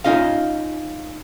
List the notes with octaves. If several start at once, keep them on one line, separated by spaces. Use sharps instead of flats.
C#4 D#4 F4 D#5 F5